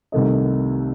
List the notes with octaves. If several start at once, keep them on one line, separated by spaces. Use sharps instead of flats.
C2 C3 D#3 A3 D#5